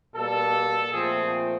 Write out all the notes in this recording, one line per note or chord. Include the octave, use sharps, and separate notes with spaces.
B2 G3 A#3 A4
A#2 F3 A3 C4 G#4